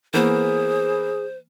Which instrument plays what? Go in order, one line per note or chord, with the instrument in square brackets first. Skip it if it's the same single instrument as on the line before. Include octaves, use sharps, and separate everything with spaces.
[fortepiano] E3 A#3 B3 [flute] G#4 [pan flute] C5